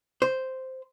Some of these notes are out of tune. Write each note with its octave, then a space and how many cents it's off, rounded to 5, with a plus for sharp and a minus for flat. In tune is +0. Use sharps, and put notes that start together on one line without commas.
C5 -5